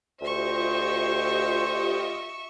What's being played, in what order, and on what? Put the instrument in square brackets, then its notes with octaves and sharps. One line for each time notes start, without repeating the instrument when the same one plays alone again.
[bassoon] D2 [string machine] F4 G4 D#5 [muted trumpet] C5 [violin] E5 C#6